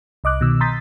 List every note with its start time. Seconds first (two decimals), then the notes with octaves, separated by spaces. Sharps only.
0.24 C2 D#5 D6 F#6
0.41 B2 D#3 E6
0.60 A#5 C6 D#6 G6 A6 B6